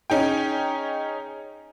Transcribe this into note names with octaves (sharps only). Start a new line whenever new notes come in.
C#4 D#4 G#4 G5